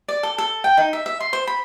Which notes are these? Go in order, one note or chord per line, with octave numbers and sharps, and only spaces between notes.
D5
A4
A4
G5
D#4
E5
E5
C6
C5
B5